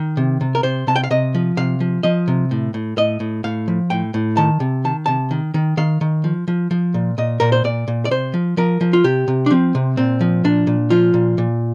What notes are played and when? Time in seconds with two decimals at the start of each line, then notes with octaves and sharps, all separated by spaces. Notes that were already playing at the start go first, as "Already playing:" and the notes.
Already playing: D#3
0.17 C3
0.41 C3
0.55 A#4
0.63 C3 C5
0.87 C3 A5
0.96 G5
1.04 F5
1.11 C3 D#5
1.35 F3
1.57 C3 F5
1.80 F3
2.03 F3 D#5
2.28 C3
2.51 A2
2.74 A2
2.97 A2 D#5
3.20 A2
3.44 A2 F5
3.68 F3
3.90 A2 G5
4.14 A2
4.37 D#3 A5
4.60 C3
4.85 D#3 A5
5.06 C3 A5
5.31 D#3
5.54 D#3
5.77 D#3 F5
6.01 D#3
6.24 F3
6.48 F3
6.71 F3
6.94 A#2
7.18 A#2 D#5
7.40 A#2 A#4
7.52 C5
7.64 A#2 D5
7.88 A#2
8.05 D5
8.11 C3 C5
8.34 F3
8.57 F3 A#4
8.81 F3
8.93 F4
9.04 C3 G4
9.28 C3
9.46 D4
9.50 F3 C4
9.75 C3
9.97 A#2 C4
10.21 F3
10.44 A#2 D4
10.67 A#2
10.90 F3 F4
11.14 A#2
11.38 A#2